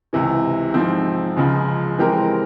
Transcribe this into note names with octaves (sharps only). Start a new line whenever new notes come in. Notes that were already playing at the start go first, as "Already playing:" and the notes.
C#2 C3 E3
G#2 F3 C4
C#2 C#3 F3 G#3
E3 G#3 C4 G4 A#4